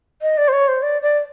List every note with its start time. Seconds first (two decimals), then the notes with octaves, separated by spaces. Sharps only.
0.22 D#5
0.37 D5
0.48 C5
0.53 C#5
0.68 C5
0.82 D5
1.02 D5